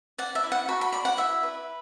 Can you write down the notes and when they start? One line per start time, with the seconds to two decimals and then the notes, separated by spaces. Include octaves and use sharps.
0.18 D5 F#5
0.35 E5
0.43 E4
0.52 F#5
0.68 F#4 B5
0.81 B5
0.92 D5 B5
1.05 F#5
1.17 E4 E5
1.43 B4